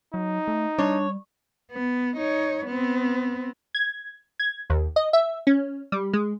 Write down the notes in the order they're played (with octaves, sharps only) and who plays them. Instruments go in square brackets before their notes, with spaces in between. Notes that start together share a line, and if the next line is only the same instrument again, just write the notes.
[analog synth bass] F#3 [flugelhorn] D#4
[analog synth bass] A3
[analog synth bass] G3 [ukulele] D4 [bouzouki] C#5
[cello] B3
D#4 C#5
B3 C4
[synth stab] G#6
G#6
D#2
D#5
E5
C#4
G3
G#3